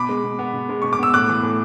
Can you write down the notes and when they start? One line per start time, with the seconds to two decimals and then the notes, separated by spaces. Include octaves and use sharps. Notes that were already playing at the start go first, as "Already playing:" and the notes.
Already playing: B2 B5 D6
0.09 G#3
0.24 B2
0.39 B3
0.54 B2
0.69 G#3
0.82 B2 C#6
0.93 D6
0.99 B3 E6
1.14 A2 D6 F#6
1.28 E3
1.43 A2